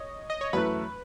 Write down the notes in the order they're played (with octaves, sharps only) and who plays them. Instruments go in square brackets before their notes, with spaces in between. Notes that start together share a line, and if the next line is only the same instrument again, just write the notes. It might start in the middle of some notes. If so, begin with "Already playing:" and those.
Already playing: [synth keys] C#5 D#5
D#5
C#5
[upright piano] F#2 E3 A3 [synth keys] B4